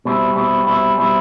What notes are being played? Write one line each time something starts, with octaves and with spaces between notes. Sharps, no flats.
B2 G3 C4 E4
B2 G3 C4 E4
B2 G3 C4 E4
B2 G3 C4 E4